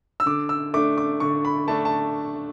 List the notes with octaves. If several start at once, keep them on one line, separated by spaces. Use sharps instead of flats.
E6
D3 D6
E6
A3 D4 D6
D6
D3 C#6
B5
A3 D4 A5
A5